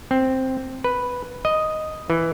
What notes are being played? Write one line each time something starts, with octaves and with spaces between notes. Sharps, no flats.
C4
B4
D#5
E3